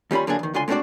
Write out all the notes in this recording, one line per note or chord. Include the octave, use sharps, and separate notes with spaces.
D#2 G3 C#4 F4 B5
D3 F#3 A#3 D4 G#4
E2 D#3
C#2 D3 F4 G#5 C6
G#3 A3 C4 D4 F#4 D5